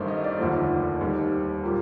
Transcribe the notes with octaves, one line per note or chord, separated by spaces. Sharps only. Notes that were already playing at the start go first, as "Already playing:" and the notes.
Already playing: A1 G2 D#3 A3 A#4 C5
D#5
D5
F1 D#2 D3 F3 A3 C5
D#2 D#3 G3
A#2 G3 A#4